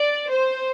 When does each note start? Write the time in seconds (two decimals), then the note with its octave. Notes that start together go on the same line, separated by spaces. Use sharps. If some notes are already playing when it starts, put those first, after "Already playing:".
Already playing: D5
0.28 C5